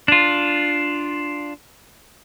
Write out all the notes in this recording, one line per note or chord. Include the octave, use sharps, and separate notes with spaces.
D4 F4